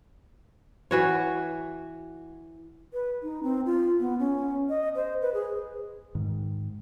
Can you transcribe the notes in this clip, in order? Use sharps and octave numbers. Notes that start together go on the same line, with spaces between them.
E3 F#4 C#5
B4
D#4
C4
F4
B3
C#4
D#5
C5
B4
G#4
G#2 D#3